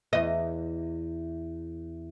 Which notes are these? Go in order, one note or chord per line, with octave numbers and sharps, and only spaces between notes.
E2 D#5